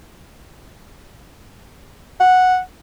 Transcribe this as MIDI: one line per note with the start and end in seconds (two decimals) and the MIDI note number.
2.20 2.59 78